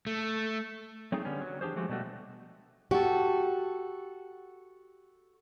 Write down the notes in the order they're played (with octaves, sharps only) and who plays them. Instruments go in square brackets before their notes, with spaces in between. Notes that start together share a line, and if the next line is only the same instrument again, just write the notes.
[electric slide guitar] A3
F#3 A3 C4 D#4 G#4
D3 G3 B3 C#4
F#3
E3 D4 G4 G#4 C5
F3 G#3 A3 F#4 G4
B2 G3 A3 F#4
[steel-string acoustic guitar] F#4 A4 [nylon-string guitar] G4